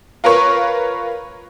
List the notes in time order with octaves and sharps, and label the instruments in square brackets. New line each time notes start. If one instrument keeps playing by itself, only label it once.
[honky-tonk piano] F4 A#4 B4 C#5 C#6